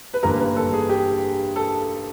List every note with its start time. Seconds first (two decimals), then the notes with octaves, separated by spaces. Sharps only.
0.14 B4
0.23 A1 G2 D3 G3 A#3 A#4
0.40 B4
0.56 A4
0.73 G#4
0.89 G4
1.56 A4